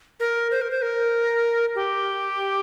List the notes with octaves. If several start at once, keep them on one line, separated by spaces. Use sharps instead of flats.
A#4
C5
A#4
C5
A#4
G4